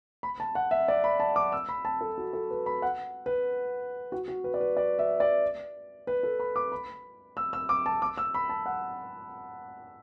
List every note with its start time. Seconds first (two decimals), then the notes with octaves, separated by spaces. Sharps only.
0.23 B5
0.40 A5
0.55 F#5
0.71 E5
0.88 D5
1.04 B5
1.20 A5
1.36 D6
1.52 E6
1.69 B5
1.85 A5
2.01 A4
2.18 F#4
2.33 A4
2.51 B4
2.66 B5
2.82 F#5
3.26 B4
4.12 F#4
4.28 F#4
4.44 B4
4.54 D5
4.60 B4
4.77 D5
4.99 E5
5.20 D5
6.07 B4
6.23 A4
6.40 B5
6.56 D6
6.72 B5
7.37 E6
7.53 E6
7.69 D6
7.86 A5
8.02 D6
8.18 E6
8.34 B5
8.49 A5
8.66 F#5